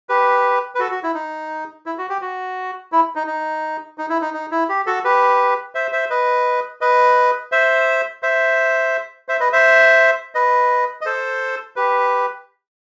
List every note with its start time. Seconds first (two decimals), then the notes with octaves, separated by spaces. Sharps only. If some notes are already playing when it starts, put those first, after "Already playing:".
0.09 G4 B4
0.75 B4
0.79 F#4 A4
0.91 F#4
1.03 E4
1.15 D#4
1.86 E4
1.98 F#4
2.09 G4
2.21 F#4
2.92 E4
3.15 D#4
3.27 D#4
3.98 D#4
4.10 E4
4.21 D#4
4.34 D#4
4.51 E4
4.69 G4
4.86 F#4 A4
5.04 G4 B4
5.75 C5 E5
5.92 C5 E5
6.10 B4 D#5
6.81 B4 D#5
7.52 C5 E5
8.23 C5 E5
9.28 C5 E5
9.40 B4 D#5
9.53 C5 E5
10.35 B4 D#5
11.01 D#5
11.06 A4 C5
11.76 G4 B4